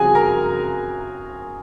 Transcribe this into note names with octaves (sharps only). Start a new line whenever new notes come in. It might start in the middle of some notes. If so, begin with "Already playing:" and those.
Already playing: C#3 F3 C4 F#4 G#4 G#5
A#4 A#5